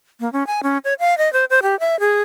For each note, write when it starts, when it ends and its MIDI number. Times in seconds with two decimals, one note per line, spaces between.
0.20 0.31 58
0.33 0.46 61
0.47 0.61 80
0.63 0.78 61
0.84 0.94 73
1.00 1.17 77
1.18 1.31 75
1.33 1.45 72
1.50 1.60 72
1.63 1.78 67
1.80 1.99 76
2.00 2.22 68